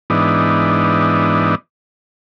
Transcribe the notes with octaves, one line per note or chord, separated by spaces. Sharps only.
G#2 E3 B3 D4 D#4